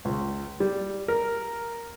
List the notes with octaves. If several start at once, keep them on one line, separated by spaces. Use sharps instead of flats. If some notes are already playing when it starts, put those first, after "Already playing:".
C#2
G3
A#4